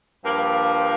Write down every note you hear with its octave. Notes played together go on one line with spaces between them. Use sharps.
G2 F3 A#3